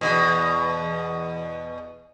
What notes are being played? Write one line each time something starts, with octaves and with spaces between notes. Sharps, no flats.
E2 G#2 B2